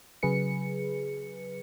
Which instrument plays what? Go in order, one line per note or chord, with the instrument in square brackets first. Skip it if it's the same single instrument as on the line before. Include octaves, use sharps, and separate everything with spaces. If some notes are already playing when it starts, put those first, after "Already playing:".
[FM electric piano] C#3 F#3 G#4 B4 C#7